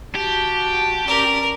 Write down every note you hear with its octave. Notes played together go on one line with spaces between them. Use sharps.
F#4 G4 A5
C#4 A#4 D5